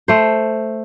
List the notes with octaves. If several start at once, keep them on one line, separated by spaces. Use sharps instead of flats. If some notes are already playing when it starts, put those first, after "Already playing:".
A3 C5